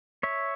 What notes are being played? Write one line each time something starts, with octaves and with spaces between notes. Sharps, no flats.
C#5 E5